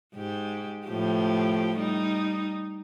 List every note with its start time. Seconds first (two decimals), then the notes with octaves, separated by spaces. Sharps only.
0.15 G#2 G4
0.87 A2 F3 G4
1.79 G3 D#4